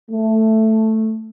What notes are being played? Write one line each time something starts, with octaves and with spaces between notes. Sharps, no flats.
A3